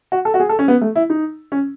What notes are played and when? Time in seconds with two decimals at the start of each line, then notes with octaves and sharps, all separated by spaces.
0.12 F#4
0.25 A4
0.34 F#4
0.40 G#4
0.49 A4
0.59 C#4
0.68 B3
0.81 A3
0.96 E4
1.10 D#4
1.52 C#4